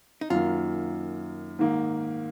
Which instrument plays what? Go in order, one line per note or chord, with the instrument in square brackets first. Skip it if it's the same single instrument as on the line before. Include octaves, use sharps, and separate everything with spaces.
[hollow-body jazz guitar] D#4
[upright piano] F#2 D#3 A#3 [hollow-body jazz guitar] F4
[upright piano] G#2 D#3 A#3